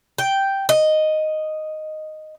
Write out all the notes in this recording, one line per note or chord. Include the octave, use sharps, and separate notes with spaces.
G5
D#5